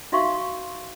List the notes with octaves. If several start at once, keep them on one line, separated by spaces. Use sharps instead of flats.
D#4 F#4 E5 F5 C6 C#6